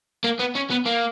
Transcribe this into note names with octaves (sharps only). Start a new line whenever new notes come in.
A#3
B3
C#4
B3
A#3